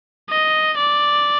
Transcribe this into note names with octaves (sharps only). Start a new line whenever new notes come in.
D#5
D5